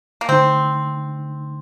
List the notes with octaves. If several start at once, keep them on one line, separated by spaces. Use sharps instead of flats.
A#3
D3 A3 C4 D#4